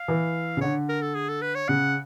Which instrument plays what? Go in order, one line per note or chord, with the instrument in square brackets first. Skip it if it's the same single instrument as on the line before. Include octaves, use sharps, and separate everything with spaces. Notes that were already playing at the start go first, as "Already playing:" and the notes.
Already playing: [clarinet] F5
[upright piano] E3
C#3
[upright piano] D3 [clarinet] C#5
[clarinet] A#4
A4
G#4
A4
B4
C#5
[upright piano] C#3 [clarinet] F#5